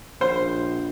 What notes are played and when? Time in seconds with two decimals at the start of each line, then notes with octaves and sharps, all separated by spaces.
0.21 A#1 C5